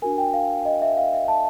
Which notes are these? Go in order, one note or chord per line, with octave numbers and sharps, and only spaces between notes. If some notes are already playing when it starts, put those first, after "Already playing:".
D4 F#4 A#4 G#5
G5
F5
D#5
E5
F5
E5
A5